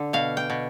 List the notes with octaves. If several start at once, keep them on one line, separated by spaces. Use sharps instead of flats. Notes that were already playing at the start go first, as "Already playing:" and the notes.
Already playing: D3
B2 F5
G5
B2